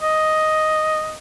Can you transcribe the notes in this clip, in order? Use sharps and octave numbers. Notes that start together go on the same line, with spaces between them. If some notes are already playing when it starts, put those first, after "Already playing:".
D#5